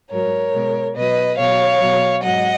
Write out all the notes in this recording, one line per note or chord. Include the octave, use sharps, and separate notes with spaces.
G#2 F#3 A#4 C#5
B2 G#3
B2 F#3 B4 D#5
B2 F#3 C#5 F5
B2 F#3
G#2 F#3 D#5 F#5